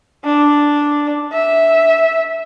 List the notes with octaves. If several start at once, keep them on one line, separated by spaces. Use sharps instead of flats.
D4
E5